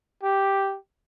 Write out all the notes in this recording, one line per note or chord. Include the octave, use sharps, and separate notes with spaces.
G4